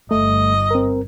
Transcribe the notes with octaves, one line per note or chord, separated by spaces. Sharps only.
G1 A3 D#5
C4 A#4